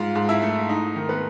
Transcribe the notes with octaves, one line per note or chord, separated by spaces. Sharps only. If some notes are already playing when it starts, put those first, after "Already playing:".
Already playing: G#2 F4 F5
G#2
E4 E5
A3
D#4
D#3
B3 B4